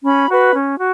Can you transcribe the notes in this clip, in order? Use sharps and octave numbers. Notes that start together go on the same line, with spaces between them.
C#4 B5
F#4 B4
C#4
F#4